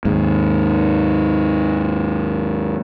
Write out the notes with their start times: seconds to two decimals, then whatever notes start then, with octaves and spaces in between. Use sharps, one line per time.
0.05 D#2 G#2